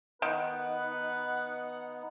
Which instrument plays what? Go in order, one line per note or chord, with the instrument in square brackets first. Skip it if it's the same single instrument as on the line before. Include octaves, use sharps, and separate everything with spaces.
[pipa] D#3 [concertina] B3 D#4 [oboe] B4 [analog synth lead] F#5